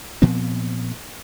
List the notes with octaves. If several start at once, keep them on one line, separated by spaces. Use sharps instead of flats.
A#2 F3 B3 C4